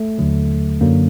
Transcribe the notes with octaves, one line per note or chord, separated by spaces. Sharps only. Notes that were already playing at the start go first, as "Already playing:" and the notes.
Already playing: A3
D#2 D3 F#3
F#2 D3 F#3 A#3